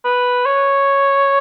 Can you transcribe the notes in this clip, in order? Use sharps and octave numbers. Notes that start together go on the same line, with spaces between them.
B4
C#5